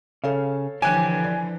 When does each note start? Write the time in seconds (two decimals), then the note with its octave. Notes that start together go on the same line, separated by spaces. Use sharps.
0.24 C#3 A4 C#5 F5
0.82 D3 E3 F3 G4 C#5 G#5 F#6
1.24 D5